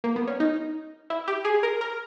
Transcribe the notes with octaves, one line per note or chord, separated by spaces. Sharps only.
A#3
B3
C#4
D#4
E4
G4
G#4
A#4
A#4